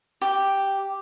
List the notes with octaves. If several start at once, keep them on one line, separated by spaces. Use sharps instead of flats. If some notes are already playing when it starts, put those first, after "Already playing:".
G4